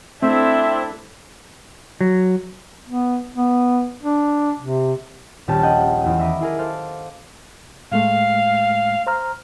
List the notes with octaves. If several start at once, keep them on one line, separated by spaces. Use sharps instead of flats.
A3 C4 D4 E4 E5
F#3
B3
B3
D4
C3
D#1 A#1 C#4 G4 A5
D#5 F#5 G5
E2 A3 D#6
E5 A#5 B5 D6 D#6
E4 G#4 A#4
A4 C5 F5 D6 A6
A2 G#3 A3 F5
C5 A#5 F6